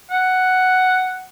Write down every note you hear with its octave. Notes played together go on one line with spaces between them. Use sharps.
F#5